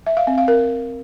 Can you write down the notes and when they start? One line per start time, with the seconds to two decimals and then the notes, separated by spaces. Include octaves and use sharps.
0.06 E5
0.17 F5
0.27 C4
0.38 F5
0.48 A#4